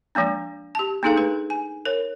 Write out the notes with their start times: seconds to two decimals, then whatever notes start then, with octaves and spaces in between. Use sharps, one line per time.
0.15 F3 G#3 A#3 D4
0.75 G4 A5
1.03 A#3 D4 D#4 G#4 A4 F5
1.17 A3 G#4 B4
1.50 G#5
1.85 A#4 C#5